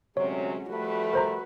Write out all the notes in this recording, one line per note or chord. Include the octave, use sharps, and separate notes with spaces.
D2 C3 F#3 G#3 C#4 C#5
F3 G3 A3 F#4 B4
A#4 C5 A#5